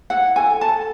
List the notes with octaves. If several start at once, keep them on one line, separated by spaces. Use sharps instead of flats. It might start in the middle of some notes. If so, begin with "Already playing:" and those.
E4 F#5
A4 G#5
A4 A5